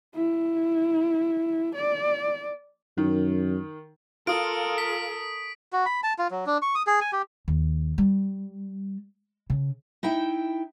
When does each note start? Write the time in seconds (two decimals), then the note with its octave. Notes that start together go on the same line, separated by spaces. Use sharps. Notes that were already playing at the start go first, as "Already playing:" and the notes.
0.15 E4
1.75 D5
2.98 F#2 D#3
4.27 F4 A4 A#4 D#6 D7
4.78 B6
5.73 F#4
5.86 B5
6.03 A5
6.18 F4
6.31 F#3
6.46 D4
6.62 C#6
6.75 D#6
6.87 G#4
7.01 G#5
7.13 G4
7.48 D#2
7.98 G3
9.50 C#3
10.03 D#4 E4 E5 G5